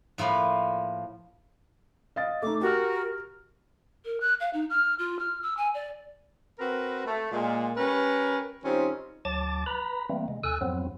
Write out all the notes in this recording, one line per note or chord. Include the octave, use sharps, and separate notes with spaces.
A2 F3 A#3 B4
D#5 F5 A6
A3 D#4 D6
F#4 G4 A#4 F6
A#4
F#6
F5
D#4
F6
F4
F6
E6
G#5
D5
C4 F#4 A#4 B4
A3
A#2 G#3
G3 C#4 A#4 B4
D#3 G3 C4 C#4 D#4 F4
D2 F#3 A5 D6 A6
B4 A#5 B5
E3 G3 A3 A#3 C4
C3 G#3
D#2 A4 G#5 E6 F#6
F2 G#2 F3 F#3 B3 C4